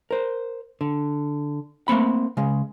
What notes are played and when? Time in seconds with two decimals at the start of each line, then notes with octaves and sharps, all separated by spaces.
0.11 A#4 C5
0.81 D3
1.88 A3 A#3 C4 B5
2.37 C#3 G#3